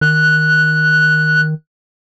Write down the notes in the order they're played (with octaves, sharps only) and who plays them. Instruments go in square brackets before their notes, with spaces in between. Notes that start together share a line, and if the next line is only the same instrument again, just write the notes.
[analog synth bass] D#3 [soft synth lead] F#6